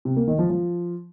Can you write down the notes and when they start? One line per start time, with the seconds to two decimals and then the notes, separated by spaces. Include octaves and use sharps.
0.05 C3
0.16 A#3
0.27 D#3
0.39 F3
0.50 F3